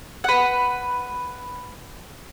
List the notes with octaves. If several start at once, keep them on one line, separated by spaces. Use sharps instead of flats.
B4 F#5